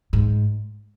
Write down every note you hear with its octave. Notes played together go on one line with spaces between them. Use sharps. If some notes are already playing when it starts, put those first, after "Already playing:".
G#2